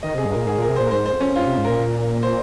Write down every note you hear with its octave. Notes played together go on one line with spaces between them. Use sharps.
D#3 D#5
C3 G#4
G2 G#4
A#2 A#4
G#2 G#4
A#2 A#4
C3
A#2 C5
A#4
G#2 C5
C5
F2
C#4
G2 F4
C3
G#2
A#2 A#4
A#2
C5